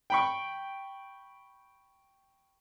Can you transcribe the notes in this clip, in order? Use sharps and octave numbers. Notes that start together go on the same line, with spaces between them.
G5 B5 C#6